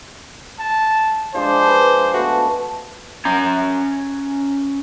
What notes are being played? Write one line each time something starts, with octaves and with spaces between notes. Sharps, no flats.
A5
F3 G#3 D4 C5
B4 D6
A3 B3 F#4
C#4 A#5